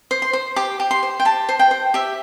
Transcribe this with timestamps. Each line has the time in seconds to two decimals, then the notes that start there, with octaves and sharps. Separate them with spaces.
0.11 C5
0.22 C6
0.33 C5
0.56 G4 D6
0.80 G4
0.91 C6
1.03 C5
1.20 G5
1.25 G4 A5
1.49 C5
1.59 G5
1.71 C5
1.94 G4 E5